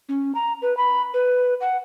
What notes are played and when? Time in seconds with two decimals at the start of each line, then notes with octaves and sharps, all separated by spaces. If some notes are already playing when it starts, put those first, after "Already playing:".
0.09 C#4
0.35 A#5
0.62 B4
0.77 B5
1.14 B4
1.61 F#5